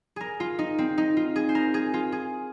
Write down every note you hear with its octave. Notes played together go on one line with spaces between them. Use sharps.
G#4 A#4
F4
D#4
C4
D#4
F4
G#4
C5
A#4
G#4
F4
G#4